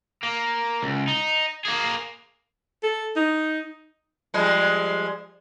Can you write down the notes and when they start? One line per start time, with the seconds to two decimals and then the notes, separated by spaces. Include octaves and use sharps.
0.23 A#3
0.83 C#2
1.08 D#4
1.65 A#3 G#4
2.83 A4
3.16 D#4
4.34 F3 G3 G#3